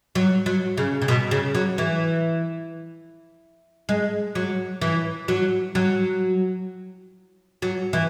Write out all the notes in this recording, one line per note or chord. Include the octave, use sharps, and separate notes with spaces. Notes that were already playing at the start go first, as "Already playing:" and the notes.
F#3
F#3
C#3
C#3
B2
C#3
F#3
E3
G#3
F#3
E3
F#3
F#3
F#3
E3